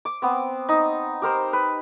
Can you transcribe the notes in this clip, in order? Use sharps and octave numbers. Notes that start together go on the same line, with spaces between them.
D6
B3 C4
D#4
G4 A#4 C5
B4